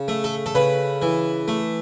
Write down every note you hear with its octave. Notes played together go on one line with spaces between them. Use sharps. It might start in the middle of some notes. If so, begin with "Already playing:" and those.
Already playing: C#3
A3
A4
A4
C#3 B4
E3
A3